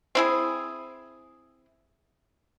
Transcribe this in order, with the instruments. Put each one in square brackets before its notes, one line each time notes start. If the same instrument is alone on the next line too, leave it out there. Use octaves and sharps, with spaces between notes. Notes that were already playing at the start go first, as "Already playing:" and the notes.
[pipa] C4 E4 G#4